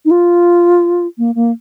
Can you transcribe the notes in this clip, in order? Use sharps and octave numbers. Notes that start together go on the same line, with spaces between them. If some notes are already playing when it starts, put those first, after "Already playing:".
D#4
F4
A#3
A#3